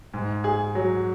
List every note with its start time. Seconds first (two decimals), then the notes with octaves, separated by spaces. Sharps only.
0.14 G#2
0.44 G#4
0.75 F#3